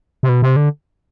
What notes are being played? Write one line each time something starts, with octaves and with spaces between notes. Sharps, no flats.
C3
B2
C3
D3